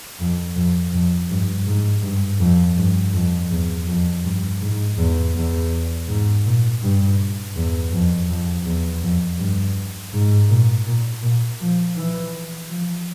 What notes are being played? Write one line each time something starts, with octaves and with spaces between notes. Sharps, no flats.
F2
F2
F2
G2
G#2
G2
F2
G2
F2
E2
F2
G2
G#2
E2
E2
G#2
A#2
G2
E2
F2
F2
E2
F2
G2
G#2
A#2
A#2
A#2
F3
E3
F3